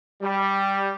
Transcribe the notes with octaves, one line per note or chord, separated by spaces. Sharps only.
G3